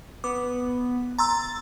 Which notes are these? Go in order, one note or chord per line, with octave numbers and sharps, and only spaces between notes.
B3 D6
A#5 C6 E6 A6